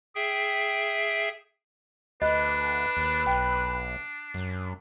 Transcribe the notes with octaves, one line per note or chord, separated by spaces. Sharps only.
G#4 E5 G5
D2 D4 B4 D#5
D#2
B1 D4 G5
F#2